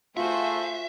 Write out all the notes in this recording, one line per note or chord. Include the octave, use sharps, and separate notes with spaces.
A3 F4 F#4 G#4 C5 E5